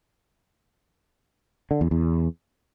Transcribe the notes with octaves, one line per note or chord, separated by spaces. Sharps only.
D3
E2
E2